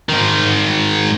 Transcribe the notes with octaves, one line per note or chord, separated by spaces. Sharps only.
G#2 D#3